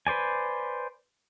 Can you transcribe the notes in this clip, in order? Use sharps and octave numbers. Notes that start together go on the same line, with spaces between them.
B4 C5 D5 G#5